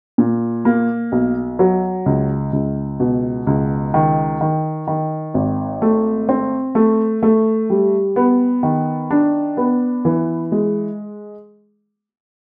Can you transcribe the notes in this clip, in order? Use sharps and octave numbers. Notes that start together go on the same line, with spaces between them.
A#2
A#3
B1
F#3
C#2
C#2
B2
C#2
D#3
D#3
D#3
G#1
A3
C4
A3
A3
G3
B3
D#3
D4
B3
E3
G#3